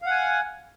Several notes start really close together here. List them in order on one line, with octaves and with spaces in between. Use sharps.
F5 F#5 G#5